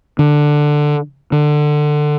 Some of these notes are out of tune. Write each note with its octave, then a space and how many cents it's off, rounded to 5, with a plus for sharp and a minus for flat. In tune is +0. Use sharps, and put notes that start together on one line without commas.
D3 +10
D3 +20